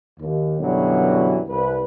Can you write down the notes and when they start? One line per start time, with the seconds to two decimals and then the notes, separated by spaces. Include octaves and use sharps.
0.20 D#2
0.59 F#2 B2 D3 E3 F#3 G3
1.49 C2 B4